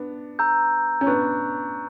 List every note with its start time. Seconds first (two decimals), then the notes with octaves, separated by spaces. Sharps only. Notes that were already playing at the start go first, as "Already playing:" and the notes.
Already playing: B3 D4
0.39 A#5 E6 G6
1.01 C#4
1.07 B3 D4 C#6 F#6